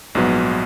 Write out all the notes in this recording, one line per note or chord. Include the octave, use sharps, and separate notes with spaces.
A#1 G#2 F#3 B3